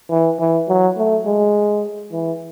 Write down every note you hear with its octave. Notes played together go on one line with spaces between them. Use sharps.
E3
E3
F#3
A3
G#3
E3